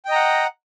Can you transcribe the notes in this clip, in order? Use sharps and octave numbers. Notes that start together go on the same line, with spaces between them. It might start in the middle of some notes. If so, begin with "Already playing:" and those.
D#5 F#5 G5 A#5